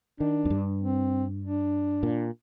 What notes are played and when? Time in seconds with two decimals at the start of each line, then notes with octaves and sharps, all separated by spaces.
0.20 D#3 D4
0.45 F2
0.50 G2
0.81 C4
1.42 D4
2.03 A#2